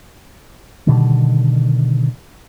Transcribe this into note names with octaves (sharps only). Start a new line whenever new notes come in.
B2 D3 D#3 G3